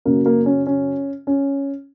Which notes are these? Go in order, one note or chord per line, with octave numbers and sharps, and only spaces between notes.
F#2 C#3 F#3 A#3
A#3
C#4
C#4
C#4